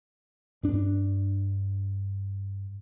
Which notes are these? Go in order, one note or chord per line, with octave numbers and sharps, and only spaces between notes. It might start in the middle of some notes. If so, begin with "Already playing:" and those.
G2 D4